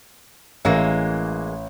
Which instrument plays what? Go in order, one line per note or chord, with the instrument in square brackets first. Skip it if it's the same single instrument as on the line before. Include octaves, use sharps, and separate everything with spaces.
[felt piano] A1 [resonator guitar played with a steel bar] E3 G#3 A#3